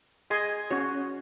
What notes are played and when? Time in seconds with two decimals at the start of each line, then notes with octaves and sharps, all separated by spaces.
0.30 G#4 D#5 G#5 C6
0.71 C#4 F#4 C#5